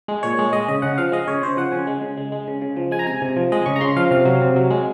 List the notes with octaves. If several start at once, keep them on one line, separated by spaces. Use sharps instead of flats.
G#3
A#2 C#5
G#3
G#3 D#5
C#3 D#5
C#3 F#5
F3 F5
G#3 D#5
C#3 C#5
C#3 C5
F3 F#5
C#3 G#5
G#3
C#3
G#3
G#3
C#3
C#3
F3
G#3 G#5
A#5
C3 G#5
C3
F3
G#3 D#5
C#3 C#6
A#5
C#3 C6
F3 F5
C3 F5
F#3
C3
F#3
G#3